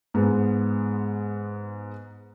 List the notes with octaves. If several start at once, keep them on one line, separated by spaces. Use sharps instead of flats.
G#2 G#3 B3